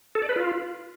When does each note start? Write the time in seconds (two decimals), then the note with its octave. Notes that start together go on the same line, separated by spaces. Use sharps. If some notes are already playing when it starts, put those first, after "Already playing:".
0.15 A4
0.22 D5
0.29 B4
0.36 F4